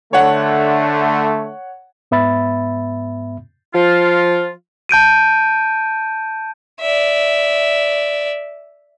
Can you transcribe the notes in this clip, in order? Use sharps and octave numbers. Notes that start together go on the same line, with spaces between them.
D3 A3 C#5 F#5
G#2 B3 E5 B5 A6
F3 F4
A5 G6 D7 D#7
D5 E5